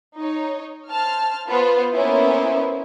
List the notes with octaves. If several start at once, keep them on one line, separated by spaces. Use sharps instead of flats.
D#4 C#5
C5 A5 F6
B3 F4 C5
A#3 B3 C#4 E4 C5